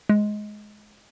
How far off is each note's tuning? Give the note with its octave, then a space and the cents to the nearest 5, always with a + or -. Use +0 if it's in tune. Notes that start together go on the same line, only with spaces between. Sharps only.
G#3 +15